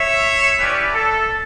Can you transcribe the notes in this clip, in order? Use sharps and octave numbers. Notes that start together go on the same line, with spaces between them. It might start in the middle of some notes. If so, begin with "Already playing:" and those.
Already playing: C#5 E5
C#4 E4 G4 B4 D5
A4